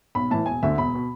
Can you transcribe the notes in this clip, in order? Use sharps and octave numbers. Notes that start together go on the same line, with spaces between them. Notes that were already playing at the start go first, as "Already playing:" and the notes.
B1 B5
A2 E3 A5
E1 G#5
D2 D3 E5
E1 B5
B2